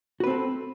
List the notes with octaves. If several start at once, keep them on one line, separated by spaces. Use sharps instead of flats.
C4 F#4 A4 B4